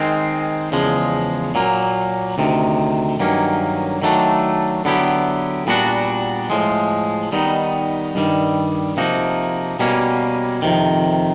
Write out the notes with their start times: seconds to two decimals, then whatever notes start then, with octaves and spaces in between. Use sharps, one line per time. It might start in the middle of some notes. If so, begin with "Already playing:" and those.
Already playing: D#3 G#3 C4
0.72 E2 C#3 F3 G#3
1.55 A#2 F#3 A#3
2.38 D2 C3 D#3
3.20 G2 D#3 F#3 A#3 C#4
4.02 D#3 F#3 A3 D4
4.85 D3 F#3 B3 E4 G4
5.67 A#2 G3 B3 D4 F#4
6.50 A2 F3 G#3
7.32 D#3 G3 B3 D#4
8.15 G2 D#3 G3
8.97 C3 F3 A#3 D#4 F#4
9.79 B2 G3 A#3 C#4
10.62 F2 C3 D#3